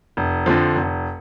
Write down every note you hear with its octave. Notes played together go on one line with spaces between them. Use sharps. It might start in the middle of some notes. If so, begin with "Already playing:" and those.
F1
F2 D3 F3
F1